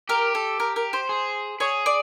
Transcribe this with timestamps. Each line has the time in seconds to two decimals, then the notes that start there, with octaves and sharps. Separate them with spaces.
0.09 G4 A#4
0.35 A4
0.60 A#4
0.76 A#4
0.93 C5
1.09 G#4
1.60 G#4 C#5
1.86 D5